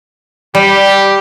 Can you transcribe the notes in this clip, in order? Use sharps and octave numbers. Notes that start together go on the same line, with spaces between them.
G3 G4